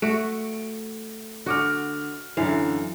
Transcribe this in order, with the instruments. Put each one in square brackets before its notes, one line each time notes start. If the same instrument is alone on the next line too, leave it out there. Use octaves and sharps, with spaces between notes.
[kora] A3 F#4 [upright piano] D7
[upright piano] D3 D6 F6 [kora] F#4
[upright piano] F#2 D3 [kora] E3 F5